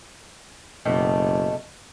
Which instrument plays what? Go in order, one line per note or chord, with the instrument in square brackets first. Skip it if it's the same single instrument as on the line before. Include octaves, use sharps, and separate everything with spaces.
[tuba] F#1 [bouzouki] B2 A3 G4